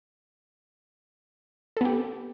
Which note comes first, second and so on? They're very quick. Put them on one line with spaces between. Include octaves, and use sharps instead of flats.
A4 B3 G4